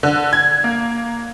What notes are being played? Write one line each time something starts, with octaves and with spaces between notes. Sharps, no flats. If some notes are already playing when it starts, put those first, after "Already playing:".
D3
G#6
A#3